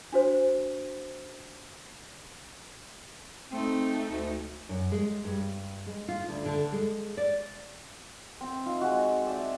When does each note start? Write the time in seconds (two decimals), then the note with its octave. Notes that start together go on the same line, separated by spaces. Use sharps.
0.12 D4 F#4 C5
3.51 A3 C4 D#4
4.09 D2
4.69 F#2
4.92 G#3
5.25 G2
5.87 G#3
6.08 F4
6.28 D2
6.45 D3
6.72 G#3
7.17 D5
8.41 C4 G5
8.66 D#4 F4
8.81 G#3 F#4
9.26 D5 E5 G5 A5